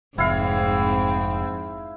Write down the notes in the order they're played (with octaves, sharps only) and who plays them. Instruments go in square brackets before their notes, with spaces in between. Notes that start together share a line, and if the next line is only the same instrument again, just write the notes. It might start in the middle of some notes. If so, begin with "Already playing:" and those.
[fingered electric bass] F1 [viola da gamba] G#2 [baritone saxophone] C4 [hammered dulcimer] E4 F5